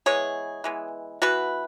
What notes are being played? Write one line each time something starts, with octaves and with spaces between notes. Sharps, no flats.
E3 G#3 B3 G#4 C#5
E3 G#3 B3
E3 B3 F#4 B4